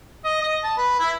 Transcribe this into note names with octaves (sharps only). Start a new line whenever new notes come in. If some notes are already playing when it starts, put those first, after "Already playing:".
D#5
D#5
A5
B4
E4